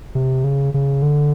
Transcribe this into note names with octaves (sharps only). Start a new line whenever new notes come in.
C3
C#3
C#3
D3